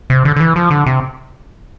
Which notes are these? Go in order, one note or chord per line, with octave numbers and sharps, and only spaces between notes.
C3
D3
D3
E3
F3
D3
C3